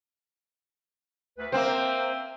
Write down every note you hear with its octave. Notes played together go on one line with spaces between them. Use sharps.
D2 B4
A#3 C4 C5 E5 F5 G5